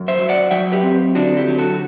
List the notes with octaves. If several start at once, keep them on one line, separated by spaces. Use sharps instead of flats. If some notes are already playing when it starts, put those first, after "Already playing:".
Already playing: F#2
C5 E5
F#3
D5 F#5
F#3 E5 G5
G4 B4
C4
D3 D4 F#4
E4 G4
F#3
F#4 A4